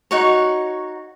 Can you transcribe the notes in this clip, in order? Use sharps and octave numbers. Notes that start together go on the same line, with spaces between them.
D#4 F#4 C#5